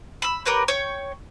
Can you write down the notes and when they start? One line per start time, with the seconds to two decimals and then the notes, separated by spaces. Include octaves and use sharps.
0.22 B5 E6
0.45 G4 A#4 B4 C#5
0.68 C#5 G5